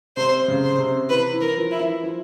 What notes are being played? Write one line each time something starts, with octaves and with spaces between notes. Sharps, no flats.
C3 C5
C#3
C5
C3
E3 B4
E3
A#4
F3
E4
E3
F3